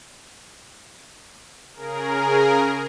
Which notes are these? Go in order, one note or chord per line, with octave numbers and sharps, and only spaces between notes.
C#3 G#4 A#4